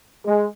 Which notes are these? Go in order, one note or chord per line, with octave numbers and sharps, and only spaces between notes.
G#3